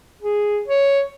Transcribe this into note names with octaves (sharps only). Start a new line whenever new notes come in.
G#4
C#5